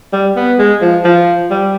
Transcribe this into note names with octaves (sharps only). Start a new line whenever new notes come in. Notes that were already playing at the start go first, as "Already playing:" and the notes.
G3
B3
G#3
F3
F3
G3